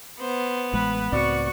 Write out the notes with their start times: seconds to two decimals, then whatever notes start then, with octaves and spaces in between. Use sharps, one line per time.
0.20 B3 C5
0.73 A1 G#3 B4
1.13 C#2 A2 C4 F#4 D5 C#6